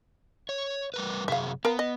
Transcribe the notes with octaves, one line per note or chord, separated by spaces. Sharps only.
C#5
G3 A#4 B4
F#2 C3 G#4 E5 F5
B3 A#4 F5 A#5
D#5